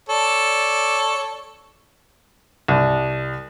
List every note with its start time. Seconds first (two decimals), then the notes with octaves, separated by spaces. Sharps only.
0.09 A4 C#5 D5
2.68 C2